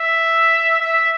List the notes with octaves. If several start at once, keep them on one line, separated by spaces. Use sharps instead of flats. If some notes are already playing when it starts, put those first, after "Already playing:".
Already playing: E5
E5